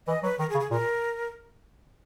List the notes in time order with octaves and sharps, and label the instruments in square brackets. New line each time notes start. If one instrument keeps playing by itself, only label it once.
[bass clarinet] E3 [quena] D#5
[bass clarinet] F#3 [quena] B4
[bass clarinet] D#3 [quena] A#4
[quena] G#4
[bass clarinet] C#3
[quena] G#4
[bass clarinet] A#2 [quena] A#4